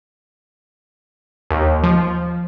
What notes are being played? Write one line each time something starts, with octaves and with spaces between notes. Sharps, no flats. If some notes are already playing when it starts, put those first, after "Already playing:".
D#2
F3